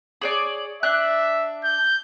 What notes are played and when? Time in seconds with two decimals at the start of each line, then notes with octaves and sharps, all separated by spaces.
0.21 G#4 C#5 D5
0.83 D4 E5 F#6
1.64 G6